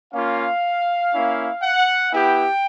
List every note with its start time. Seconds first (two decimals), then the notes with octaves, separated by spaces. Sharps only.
0.14 A#3 C#4 F4 F5
1.13 A#3 C#4 E4
1.63 F#5
2.13 B3 E4 G4 G5